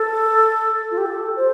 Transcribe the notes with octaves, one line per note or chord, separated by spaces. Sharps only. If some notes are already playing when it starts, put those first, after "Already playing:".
Already playing: A4
F4
G4
A4
C5